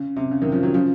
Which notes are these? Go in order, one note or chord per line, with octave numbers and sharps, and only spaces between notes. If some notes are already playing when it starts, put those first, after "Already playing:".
Already playing: C#3
C3
C#3
C3 D#3
C#3 F3
D#3 F#3
C#3 F3